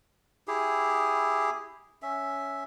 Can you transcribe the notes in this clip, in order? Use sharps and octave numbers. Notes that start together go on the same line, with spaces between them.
E4 G4 G#4
C#4 E5